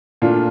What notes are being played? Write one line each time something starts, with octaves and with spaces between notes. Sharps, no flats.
A#2 A3 D4 F4